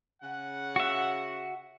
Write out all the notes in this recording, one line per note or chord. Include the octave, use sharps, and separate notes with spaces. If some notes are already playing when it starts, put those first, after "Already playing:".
C#3 F#5
F#4 E5